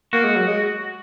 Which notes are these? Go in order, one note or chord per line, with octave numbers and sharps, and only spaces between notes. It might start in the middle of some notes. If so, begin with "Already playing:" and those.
A#3 F#4
G#3
F#3
G#3